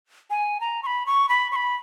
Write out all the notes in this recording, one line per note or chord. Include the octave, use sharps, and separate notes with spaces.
G#5
A#5
C#6
B5
C#6
B5
C#6
B5